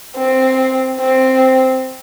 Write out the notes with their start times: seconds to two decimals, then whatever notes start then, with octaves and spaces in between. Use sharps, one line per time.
0.16 C4
0.99 C4